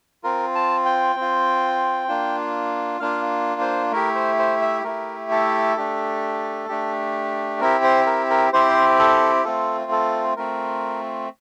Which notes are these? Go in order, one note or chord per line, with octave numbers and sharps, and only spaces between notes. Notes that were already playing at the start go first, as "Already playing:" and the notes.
C4 F4 A#4
A5
G5
C4
F4
A#3 D4 F4
A#3 D4 F4 F5
C5
A3 E4 G4 A#4
C5
C5
E5
A3 E4 G4 A#4
A4
A3 D4 G4
A3 D4 G4
C4 E4 G4 A#4
C5
A#4
A#4
C4 E4 G4 C5
A4
A3 C4 F4 A4
A4
A3 C4 F4 A#4